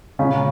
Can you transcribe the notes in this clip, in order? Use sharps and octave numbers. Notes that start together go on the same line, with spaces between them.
A#2 C#3 G#3 C#4